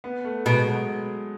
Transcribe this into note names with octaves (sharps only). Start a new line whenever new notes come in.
B3
A3
B2 G#3
F#3